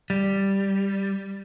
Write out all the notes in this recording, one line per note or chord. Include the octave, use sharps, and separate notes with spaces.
G3